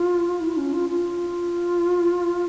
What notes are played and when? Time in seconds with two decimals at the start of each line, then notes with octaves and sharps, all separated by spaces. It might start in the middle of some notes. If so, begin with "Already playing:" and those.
Already playing: F4
0.40 E4
0.57 C#4
0.73 F4
0.89 F4